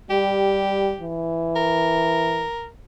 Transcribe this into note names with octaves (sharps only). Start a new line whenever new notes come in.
G3 G4
E3
A#4